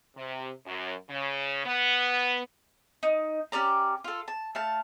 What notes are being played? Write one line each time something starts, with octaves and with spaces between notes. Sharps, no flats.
C3
F#2
C#3
B3
D#4
C#4 G4 D5 A#5
F4 A4
A5
A3 F5 A5